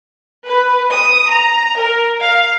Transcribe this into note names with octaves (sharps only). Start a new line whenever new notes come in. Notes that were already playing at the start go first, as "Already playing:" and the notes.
B4
D#6
A#5
A#4
F5